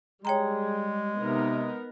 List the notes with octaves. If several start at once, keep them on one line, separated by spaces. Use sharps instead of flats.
G3 G#3 G#4 C#5 G5 A#5
C3 B3 D#4 A#4